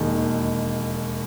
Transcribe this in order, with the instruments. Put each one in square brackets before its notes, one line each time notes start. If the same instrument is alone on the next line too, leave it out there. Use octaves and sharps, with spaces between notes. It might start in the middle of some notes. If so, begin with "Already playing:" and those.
Already playing: [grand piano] E1 D#2 D#3